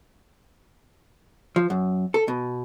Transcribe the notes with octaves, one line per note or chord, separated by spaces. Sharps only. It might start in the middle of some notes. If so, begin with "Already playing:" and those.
F3
F#2
A4
B2